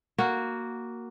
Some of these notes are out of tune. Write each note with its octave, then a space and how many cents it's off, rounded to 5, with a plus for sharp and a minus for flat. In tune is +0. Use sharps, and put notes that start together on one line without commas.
A#3 +0 F#4 +0